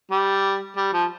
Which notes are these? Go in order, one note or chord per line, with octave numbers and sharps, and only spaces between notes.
G3
G3
F3